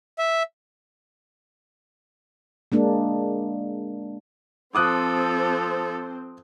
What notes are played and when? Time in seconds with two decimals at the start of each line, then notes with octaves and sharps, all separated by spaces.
0.19 E5
2.72 G#3 A#3 D4
4.75 F3 C4 A4 C5 D6 D#6 F#6